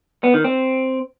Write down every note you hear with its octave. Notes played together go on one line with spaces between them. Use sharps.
B3
D#3
C4